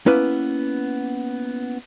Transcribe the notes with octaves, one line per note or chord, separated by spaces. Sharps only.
A#3 B3 C#4 E4 B4